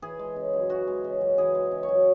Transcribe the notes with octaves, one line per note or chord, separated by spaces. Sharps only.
E3 G#4
G#3
C#3
F#2
E3 F#4
G#3
C#3
F#2
E3 G#4
G#3
C#3
C#5
F#2